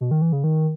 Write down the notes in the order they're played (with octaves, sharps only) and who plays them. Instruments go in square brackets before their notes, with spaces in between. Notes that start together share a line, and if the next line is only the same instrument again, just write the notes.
[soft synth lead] B2
D#3
E3
C#3
D#3